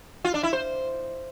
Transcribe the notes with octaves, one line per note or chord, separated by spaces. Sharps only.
F4
D4
E4
C5